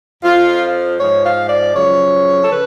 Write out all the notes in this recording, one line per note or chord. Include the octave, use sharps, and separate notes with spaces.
F2 F3 F4
G#2 F3 C#5
F5
D5
F#2 C#3 F3 C#5
A4
C#3 B4